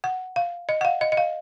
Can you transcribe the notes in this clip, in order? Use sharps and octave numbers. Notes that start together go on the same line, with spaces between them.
F#5
F5
D#5
F#5
F5
D#5
D#5
F5